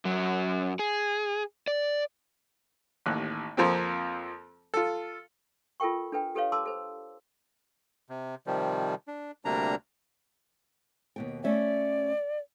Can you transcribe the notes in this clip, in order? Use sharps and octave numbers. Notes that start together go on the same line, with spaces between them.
F#2 F#3
G#4
D5
A1 D#2 F#6
F2 F3 A#3 C4
F4 A4
F4 A4 A#4 G5 C#6
D4 A4 B4 G5
G4 A4 B4 C#5 F5
A4 A5 C6 D6 E6
A4 C5
C3
C3 D#3 F3 G3
D4
D2 C3 G3 A#3 D4 A#5
D#2 B2 G5
A3 C#4 D5 E5